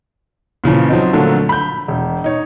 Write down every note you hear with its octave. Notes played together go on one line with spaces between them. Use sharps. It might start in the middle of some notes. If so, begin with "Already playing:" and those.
A#2 C#3 E3 F3
F3 F#3 C4 D#4
A#2 D3 F3 F#3 A3 A#3
B5 G6
E1
D#4 C#5